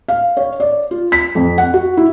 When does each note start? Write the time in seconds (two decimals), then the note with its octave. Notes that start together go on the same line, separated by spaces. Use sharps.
0.08 F5
0.37 C#5
0.60 D5
0.91 F4
1.12 B6
1.35 F2
1.58 F#5
1.74 F#4
1.97 E4